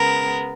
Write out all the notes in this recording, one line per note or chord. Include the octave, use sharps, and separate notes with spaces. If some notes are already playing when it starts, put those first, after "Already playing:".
Already playing: C#3 G#3 B3 A#4